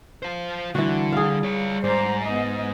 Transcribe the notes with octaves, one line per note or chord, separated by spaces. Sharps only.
F4 C5
D3 E3 G3 F#4
G#4 F5
F4 C#5
G#2 C5 D5 A#5
B3 D#5